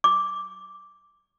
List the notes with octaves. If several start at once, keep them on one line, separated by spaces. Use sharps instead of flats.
D6